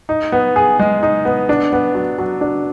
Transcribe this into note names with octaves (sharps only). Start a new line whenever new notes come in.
D#4
B3
G#4
G#3
D#4
B3
D4
B3
F#3
F#3
D4